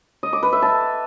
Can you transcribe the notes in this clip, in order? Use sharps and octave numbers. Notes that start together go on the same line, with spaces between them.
D#5
D6
B4
E5
A5